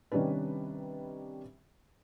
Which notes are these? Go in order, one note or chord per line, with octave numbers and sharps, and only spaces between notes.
C3 D#3 G3 C#4 D4 B4